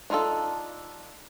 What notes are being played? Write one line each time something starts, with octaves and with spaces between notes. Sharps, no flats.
D4 D#4 F4 G#4 A4